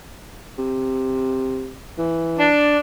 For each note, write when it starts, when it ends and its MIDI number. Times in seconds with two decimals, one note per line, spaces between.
0.59 1.71 48
1.98 2.48 52
2.39 2.76 62